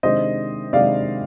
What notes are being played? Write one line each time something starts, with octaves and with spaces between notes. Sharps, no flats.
C3 D#3 G#3 D4 C5 D#5
C3 D#3 G#3 D4 D5 F5